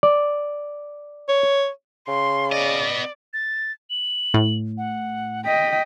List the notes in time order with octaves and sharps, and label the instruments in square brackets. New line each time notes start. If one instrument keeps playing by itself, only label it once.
[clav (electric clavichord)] D5
[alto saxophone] C#5
[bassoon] C#3 [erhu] C6
[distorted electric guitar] B3 D#5 [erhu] D5
[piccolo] A6
F#7
[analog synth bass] A2
[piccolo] F#5
[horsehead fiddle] D#5 G5 [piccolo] B6